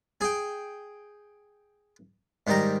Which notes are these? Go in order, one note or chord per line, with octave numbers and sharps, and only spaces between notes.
G#4 G5
G#2 D#3 G3 A#5